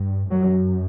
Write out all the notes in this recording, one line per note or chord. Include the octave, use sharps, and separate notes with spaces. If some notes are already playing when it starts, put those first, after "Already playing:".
Already playing: G2
F#2 F#3